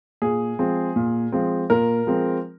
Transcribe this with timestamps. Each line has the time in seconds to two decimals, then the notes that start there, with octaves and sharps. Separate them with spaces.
0.22 A#2 G#4
0.59 F3 G#3 C4
0.96 A#2
1.32 F3 G#3 C4
1.70 A#2 A#4
2.07 F3 G#3 C4